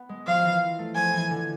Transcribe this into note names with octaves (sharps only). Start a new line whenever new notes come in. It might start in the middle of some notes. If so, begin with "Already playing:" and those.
Already playing: B3
G#3
F3 F5
E3
A3
F3 G#5
E3
D3